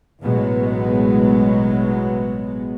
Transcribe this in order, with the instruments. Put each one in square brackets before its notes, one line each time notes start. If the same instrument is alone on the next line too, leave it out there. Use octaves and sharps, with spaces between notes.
[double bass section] A1 B2 F#3 G#3 B3